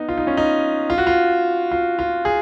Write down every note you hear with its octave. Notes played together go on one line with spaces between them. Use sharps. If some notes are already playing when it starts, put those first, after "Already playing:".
Already playing: B3 D#4
F4
D#4
C#4
D#4
F4
F#4
F4
F4
F4
G#4